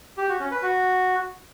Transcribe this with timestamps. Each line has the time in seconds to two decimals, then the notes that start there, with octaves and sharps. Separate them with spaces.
0.18 G4
0.29 F#4
0.40 C#4
0.51 B4
0.62 F#4